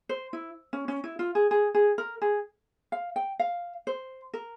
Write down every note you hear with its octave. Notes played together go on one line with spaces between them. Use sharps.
C5
E4
C#4
C#4
E4
F4
G#4
G#4
G#4
A#4
G#4
F5
G5
F5
C5
A#4